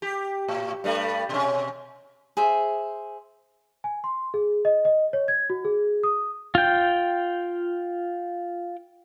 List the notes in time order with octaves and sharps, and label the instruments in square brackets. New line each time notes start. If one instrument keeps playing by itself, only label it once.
[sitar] G4
A2
G2 G3 A3
B2 C#4
[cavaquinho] G#4 C5 E5
[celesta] G#5
C6
G#4
D#5
D#5
C#5
G#6
F#4
G#4
D#6
[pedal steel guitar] F4 G5